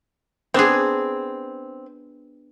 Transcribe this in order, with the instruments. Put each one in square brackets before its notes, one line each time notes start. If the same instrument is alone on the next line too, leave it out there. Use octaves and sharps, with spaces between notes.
[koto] B3 D4 G#4 [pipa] C4